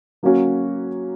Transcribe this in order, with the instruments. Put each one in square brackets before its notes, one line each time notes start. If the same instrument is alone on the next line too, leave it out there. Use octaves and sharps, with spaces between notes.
[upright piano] F#3 A#3 C#4 F#4